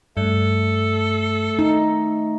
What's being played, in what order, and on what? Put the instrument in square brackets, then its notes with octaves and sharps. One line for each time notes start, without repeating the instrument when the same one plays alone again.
[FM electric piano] G2 [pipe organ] A3 [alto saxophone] A4
[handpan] D#4